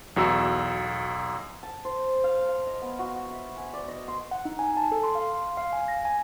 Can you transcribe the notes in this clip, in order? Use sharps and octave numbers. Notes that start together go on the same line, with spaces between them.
B1 E2 F#4 E6
A5
C5
F5
F5
D#5
B3
F#4
E5
G#5
D5
D#5
C6
F#5
D#4
G#5
A5
A4
C6
F5
C6
F5
G#5
A#6
G#5